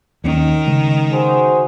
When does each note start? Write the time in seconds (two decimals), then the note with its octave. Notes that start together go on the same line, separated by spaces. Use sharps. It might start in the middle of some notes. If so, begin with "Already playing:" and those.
0.24 D#2 D#3 A#3 C#4
0.66 C#3 G#3
1.12 F#4 G#4 C5